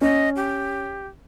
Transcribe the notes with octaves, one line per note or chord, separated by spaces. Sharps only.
C#4 D#5
G4